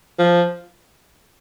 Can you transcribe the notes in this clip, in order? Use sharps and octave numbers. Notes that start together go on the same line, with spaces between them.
F3